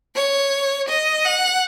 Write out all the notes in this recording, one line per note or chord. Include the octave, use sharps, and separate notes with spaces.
C#5
D#5
F#5